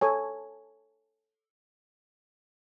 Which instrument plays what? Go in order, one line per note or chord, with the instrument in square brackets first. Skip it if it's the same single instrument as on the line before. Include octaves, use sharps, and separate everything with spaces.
[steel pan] A4 C#5 G#5